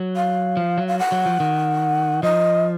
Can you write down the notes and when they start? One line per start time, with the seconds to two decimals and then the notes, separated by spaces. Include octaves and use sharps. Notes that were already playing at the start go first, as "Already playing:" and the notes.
Already playing: F#3
0.16 F5
0.57 F3
0.78 F#3
0.88 F5
0.99 F#5
1.12 F#3
1.26 F3
1.40 D#3
2.23 F3 D#5